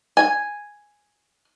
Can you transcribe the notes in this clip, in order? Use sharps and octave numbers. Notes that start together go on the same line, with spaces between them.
G#5